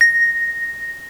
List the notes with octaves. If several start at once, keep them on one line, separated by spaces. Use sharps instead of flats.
A#6